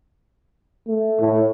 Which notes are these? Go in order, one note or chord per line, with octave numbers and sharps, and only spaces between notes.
A3
A2